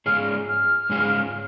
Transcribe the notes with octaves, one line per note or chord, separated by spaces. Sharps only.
G#2 G#3 C#4 F4 G#4 F6
F6
G#2 G#3 C#4 F4 G#4